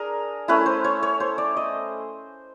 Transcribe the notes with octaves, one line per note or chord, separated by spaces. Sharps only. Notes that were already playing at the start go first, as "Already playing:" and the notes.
Already playing: D4 G#4 A#4
A3 C#4 E4 B4
C5
C#5
C#5
C5
D5
D#5